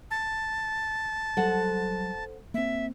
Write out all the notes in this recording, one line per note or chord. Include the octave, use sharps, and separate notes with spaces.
A5
F#3 G3 A4 C5 F#5
A#3 C4 E5